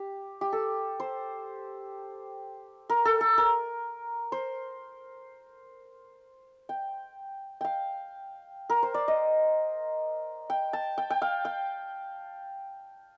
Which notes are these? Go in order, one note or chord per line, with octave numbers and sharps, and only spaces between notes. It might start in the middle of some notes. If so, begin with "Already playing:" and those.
Already playing: G4
G4
A4
C5
A#4
A4
A4
A#4
C5
G5
F5 G5
A#4
C5
D5
D#5
G5
A5
G5
G5
F5
G5